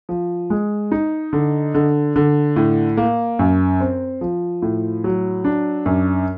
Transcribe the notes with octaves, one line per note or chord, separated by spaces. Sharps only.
F3
G#3
D#4
D3
D3
D3
A2
A#3
F#2
C4
F3
A2
F#3
D4
F#2